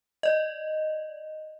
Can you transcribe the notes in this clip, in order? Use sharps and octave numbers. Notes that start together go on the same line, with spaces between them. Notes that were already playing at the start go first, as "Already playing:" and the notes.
D5 D#5